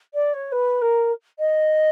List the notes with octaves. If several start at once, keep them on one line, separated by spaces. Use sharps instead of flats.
D5
C#5
B4
A#4
D#5